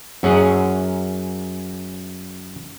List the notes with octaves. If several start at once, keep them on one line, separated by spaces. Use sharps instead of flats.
F#2 C#4 G#4 F#5